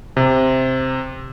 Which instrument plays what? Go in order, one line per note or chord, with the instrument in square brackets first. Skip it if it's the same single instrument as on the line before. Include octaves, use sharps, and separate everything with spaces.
[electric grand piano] C3